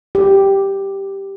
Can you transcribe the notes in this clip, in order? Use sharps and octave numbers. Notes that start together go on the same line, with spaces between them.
G4